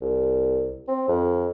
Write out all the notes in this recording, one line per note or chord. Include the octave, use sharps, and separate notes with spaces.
C2
C4
F2